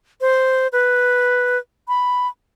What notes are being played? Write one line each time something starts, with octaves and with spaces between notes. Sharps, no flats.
C5
B4
B5